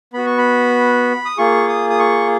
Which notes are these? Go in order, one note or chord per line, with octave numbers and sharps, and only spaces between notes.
B3 F#4 B5
C#6
B5
D#6
A#3 F4 G#4 C#6
D#6
D#6
C#6